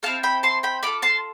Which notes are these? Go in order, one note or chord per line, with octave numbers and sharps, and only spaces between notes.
C4 E4 A4 F5 A5
G5 B5
A5 C6
G5 B5
D4 F4 A4 B5 D6
A5 C6